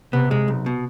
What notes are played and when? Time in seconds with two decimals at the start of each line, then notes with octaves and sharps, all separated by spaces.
0.13 C3 B3
0.31 G#3
0.48 B1
0.66 B2